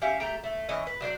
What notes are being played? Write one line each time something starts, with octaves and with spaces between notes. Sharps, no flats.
C#4 G4 E5 F5
A3 G4 G5 A#5
A3
E3 C#4 D#5
B4
F#3 D4 C5 D5